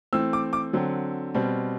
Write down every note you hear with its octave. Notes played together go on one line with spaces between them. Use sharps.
E3 A3 C4 E6
D6
D6
D3 F#3 C4
B2 G3 C4